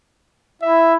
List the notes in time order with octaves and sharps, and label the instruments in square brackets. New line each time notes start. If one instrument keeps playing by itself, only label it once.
[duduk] E4 [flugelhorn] E5